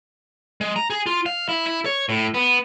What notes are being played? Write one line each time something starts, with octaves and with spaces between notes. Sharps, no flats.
G#3
A#5
G#4
F4
F5
E4
E4
C#5
A2
B3